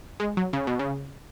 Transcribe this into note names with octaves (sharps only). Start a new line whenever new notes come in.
G#3
F#3
C#3
B2
C#3